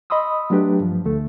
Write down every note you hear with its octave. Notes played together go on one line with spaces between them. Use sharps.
D#5 B5 C6 D#6 E6
F#3 A3 D4 G4 B4
G2 F3
D2 D3 A3 A4